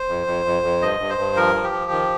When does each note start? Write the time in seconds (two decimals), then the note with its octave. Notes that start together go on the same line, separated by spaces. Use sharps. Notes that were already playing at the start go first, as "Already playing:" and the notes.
Already playing: C5
0.09 F2
0.27 F2
0.45 F2
0.63 F2
0.81 G2 D#5
1.00 G2
1.09 C5
1.18 G2
1.36 F3 A#4
1.55 F3
1.63 G4
1.72 F3
1.91 D#3